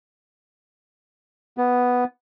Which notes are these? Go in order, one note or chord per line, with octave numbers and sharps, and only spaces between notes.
B3